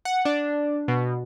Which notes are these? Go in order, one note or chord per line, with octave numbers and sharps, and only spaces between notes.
F#5
D4
B2